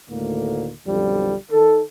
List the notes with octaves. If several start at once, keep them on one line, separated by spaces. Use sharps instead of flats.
D2 A2 D3 D#3 A#3
B1 F2 D3 F3 G3
D#3 A4